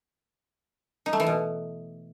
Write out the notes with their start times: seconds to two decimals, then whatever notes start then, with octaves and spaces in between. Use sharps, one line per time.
1.06 D#4
1.13 A3
1.20 E3
1.27 B2